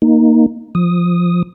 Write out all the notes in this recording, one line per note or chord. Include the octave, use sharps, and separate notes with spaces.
A#3 D#4
F3 D#6